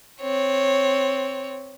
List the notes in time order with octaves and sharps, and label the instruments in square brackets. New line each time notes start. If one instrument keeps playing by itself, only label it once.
[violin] C4 C#5